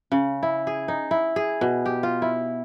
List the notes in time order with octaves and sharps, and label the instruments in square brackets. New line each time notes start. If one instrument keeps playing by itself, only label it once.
[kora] C#3
E4
G#4
D#4
E4
G#4
B2
G4
F4
E4